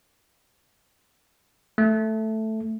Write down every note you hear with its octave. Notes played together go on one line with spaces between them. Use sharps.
A3